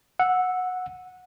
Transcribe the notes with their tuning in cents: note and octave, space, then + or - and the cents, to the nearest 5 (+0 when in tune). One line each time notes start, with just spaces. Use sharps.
F#5 -15 E6 -5